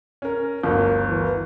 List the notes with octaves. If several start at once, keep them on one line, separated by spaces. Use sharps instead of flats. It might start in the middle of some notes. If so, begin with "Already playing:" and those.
C#4 A#4
G1 D2 A#4
E3